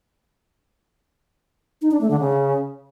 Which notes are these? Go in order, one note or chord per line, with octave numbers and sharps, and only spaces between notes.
D#4
D4
A3
D3
C#3